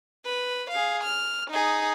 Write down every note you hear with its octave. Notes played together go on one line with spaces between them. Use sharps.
B4
G#4 F5
F6
D#4 G#4